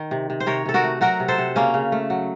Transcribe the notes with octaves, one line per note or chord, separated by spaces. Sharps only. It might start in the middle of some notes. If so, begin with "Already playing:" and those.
Already playing: D#3
C3
C3
C5
C3 A#4 C#5
C3 A4
F#4 A#4
A3
F#3 F#4 A#4
C3
A4 C5
C3
C#3 A#3 C#4
C#3
A3
F#3